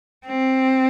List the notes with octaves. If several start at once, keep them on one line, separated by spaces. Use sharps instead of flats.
C4